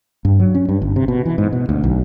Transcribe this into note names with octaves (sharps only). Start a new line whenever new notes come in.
G2
F#3
C#4
G2
G1
C3
B2
E3
G#2
B2
D2
B1